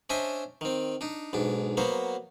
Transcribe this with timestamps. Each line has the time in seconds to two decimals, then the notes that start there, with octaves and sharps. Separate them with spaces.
0.10 C#4 D4 C5 D#5 E5 A5
0.61 D#3 C4
1.01 D4 D#4
1.33 B1 G#2 D4
1.77 F#3 A#3 B3 F#4 C5